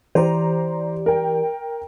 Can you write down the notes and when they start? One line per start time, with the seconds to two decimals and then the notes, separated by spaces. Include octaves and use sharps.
0.15 E3 G4 C5 D5 A#5
1.06 A#4 G5